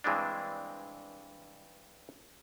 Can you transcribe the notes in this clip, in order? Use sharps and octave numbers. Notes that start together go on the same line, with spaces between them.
G2 E3 G#3 C4 D4